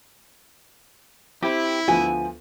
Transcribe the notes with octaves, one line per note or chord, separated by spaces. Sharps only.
C4 E4 G4
D2 F3 B3 G#5